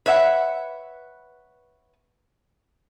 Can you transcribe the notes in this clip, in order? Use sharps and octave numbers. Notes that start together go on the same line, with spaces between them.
B4 C#5 E5 F#5